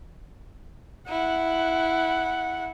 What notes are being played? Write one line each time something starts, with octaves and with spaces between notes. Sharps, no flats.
E4 F#5